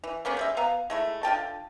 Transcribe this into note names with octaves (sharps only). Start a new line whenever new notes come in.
E3
A#3 B3 C#4 G#4
G3 G#3 E5
B3 F5 A#5
G#3 A3 E4
D3 F4 G5 A5